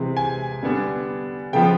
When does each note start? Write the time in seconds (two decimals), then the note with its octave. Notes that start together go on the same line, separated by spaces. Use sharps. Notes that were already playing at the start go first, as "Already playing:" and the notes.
Already playing: C3 E3 G#3 C4
0.17 G#5
0.63 D3 G3 B3 D4
1.53 C#3 F3 G#3 B3 G5